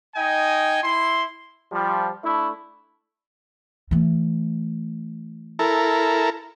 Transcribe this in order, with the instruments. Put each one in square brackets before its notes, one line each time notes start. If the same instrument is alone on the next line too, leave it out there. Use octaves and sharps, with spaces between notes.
[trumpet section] D#4 D#5 G5 G#5
E4 C6
[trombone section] F3 G3
A3 D4 E4
[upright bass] E3 A3
[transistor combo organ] E4 A4 A#4